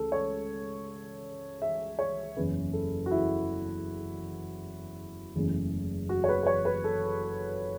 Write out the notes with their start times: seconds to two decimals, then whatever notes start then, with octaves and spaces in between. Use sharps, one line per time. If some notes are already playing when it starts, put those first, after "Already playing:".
Already playing: C#2 C#3 A3 C#4 A4
0.12 C#5
1.62 E5
1.99 C#5
2.36 F#1 E2 E3 C#4 B4
2.73 A4
3.06 F#4
3.11 E4
5.35 F#1 E2 E3 A3 C#4
6.09 F#4
6.24 C#5
6.29 B4
6.43 B4
6.47 C#5
6.65 B4
6.84 A4